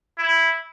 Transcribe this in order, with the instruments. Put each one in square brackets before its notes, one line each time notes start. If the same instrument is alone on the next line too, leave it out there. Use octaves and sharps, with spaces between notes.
[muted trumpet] E4